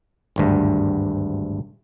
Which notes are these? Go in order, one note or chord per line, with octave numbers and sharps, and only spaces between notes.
G#1 D2 G2